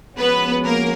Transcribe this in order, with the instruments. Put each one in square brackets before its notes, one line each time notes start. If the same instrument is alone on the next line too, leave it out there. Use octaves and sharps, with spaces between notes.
[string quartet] F3 G#3 C#4 F#4 [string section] B3 B4
[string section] A#3 A#4